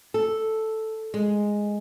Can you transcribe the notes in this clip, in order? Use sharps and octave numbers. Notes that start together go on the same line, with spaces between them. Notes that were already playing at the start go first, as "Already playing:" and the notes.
A4
G#3